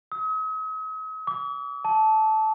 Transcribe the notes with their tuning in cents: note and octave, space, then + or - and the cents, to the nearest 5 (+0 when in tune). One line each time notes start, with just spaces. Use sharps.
D#6 +45
D6 -40
A5 -10